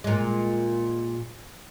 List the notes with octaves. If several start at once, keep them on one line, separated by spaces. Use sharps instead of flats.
A#2 G#3